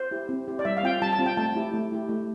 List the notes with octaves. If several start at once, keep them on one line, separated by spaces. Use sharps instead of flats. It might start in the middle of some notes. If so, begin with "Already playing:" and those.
Already playing: C5
E4 G4
C4
E4 G4
D5
G3 E5
F5
C4 F4 G5
F5
G3 A5
A5
C4 F4
G5
A3 A5
E4 G4
A3
E4 G4
A3